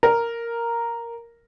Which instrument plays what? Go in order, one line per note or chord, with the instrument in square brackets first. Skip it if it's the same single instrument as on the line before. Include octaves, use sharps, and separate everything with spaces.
[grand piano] A#4